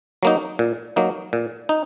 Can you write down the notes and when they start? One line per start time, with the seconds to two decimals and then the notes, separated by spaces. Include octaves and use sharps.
0.23 F#3 A#3 D#4
0.59 A#2
0.96 F#3 A#3 D#4
1.33 A#2
1.69 D#4